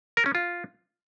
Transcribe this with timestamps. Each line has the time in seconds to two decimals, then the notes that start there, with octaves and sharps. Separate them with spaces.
0.17 A#4
0.26 C#4
0.35 F4